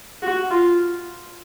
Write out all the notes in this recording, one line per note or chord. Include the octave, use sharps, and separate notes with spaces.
F#4
F4